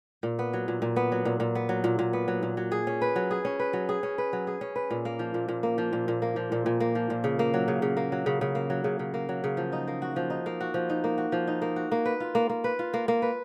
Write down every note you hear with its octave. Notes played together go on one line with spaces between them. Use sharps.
A#2
B3
F#3
A#2
A#2
B3
F#3
A#2
A#2
B3
F#3
A#2
A#2
B3
F#3
A#2
F#3
G#4
C#4
B4
F#3
G#4
C#4
B4
F#3
G#4
C#4
B4
F#3
G#4
C#4
B4
A#2
A#3
F3
A#2
A#2
A#3
F3
A#2
A#2
A#3
F3
A#2
A#2
A#3
F3
A#2
C#3
A#3
F#3
C#3
C#3
A#3
F#3
C#3
C#3
A#3
F#3
C#3
C#3
A#3
F#3
C#3
F3
D#4
A#3
F#4
F3
D#4
A#3
F#4
F3
D#4
A#3
F#4
F3
D#4
A#3
F#4
A#3
B4
F4
A#3
A#3
B4
F4
A#3
A#3
B4